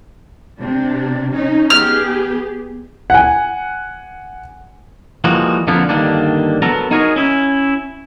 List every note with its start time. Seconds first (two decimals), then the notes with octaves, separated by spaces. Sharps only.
0.59 C3 D4
1.34 C#4 D#4
1.70 B3 G4 G#4 F6
3.10 F#5 G#5
5.24 E3 F3 G3 G#3 A#3 F#4
5.68 F2 D3 F3 A#3 B3
5.89 G2 D3 D#3 A#3 D4
6.62 F#3 B3 A4 A#4 A#5
6.91 D#4 F#4 G#4 A#4 C#5 D#5
7.16 C#4 E4